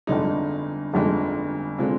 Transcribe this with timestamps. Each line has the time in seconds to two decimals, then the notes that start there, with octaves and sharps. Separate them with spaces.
0.07 G1 F2 D3 G#3 D#4
0.94 G1 F2 D3 G#3 D#4
1.78 D3 G#3 C4 F4